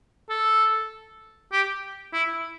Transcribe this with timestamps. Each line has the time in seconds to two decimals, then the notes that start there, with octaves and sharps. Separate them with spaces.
0.29 A4
1.52 G4
2.13 E4